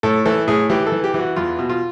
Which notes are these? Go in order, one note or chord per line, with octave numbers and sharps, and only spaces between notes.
A2 A4
E3 A4
A2 G#4
E3 G4
A4
E3
G4
E3
F#4
E2 F4
B2
F4